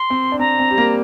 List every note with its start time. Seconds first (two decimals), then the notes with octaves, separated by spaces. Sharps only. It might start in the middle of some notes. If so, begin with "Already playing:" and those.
Already playing: C6
0.10 C4
0.32 D4
0.39 C4 A#5
0.59 C4
0.70 G3
0.78 A#3